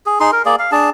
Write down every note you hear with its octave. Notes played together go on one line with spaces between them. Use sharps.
G#4
D#4 G#4 C6
A#4
A#3 G#4 D5
F5
D4 G#4 A5